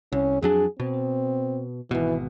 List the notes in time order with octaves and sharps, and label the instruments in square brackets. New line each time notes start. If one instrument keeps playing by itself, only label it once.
[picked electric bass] C2 [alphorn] C#4
[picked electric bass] F2 F#3 D4 [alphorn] G#4
[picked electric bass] B2 [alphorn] C4
[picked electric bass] G#1 B2 [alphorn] E3